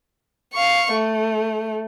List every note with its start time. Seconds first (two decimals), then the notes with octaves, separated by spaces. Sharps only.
0.54 F5 C#6
0.93 A3